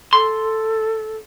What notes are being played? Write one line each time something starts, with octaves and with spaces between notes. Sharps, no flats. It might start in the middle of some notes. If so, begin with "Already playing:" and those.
A4 C6